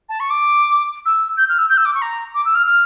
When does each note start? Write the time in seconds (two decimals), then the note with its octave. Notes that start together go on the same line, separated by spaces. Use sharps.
0.09 A5
0.20 C#6
0.30 D6
1.06 E6
1.37 G6
1.49 F6
1.59 E6
1.70 G6
1.77 E6
1.85 D6
1.95 C#6
2.02 A#5
2.34 D6
2.45 E6
2.55 F6
2.66 F6